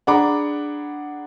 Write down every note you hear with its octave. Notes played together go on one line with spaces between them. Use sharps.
D4 G#4 F#5 A#5 B5 D6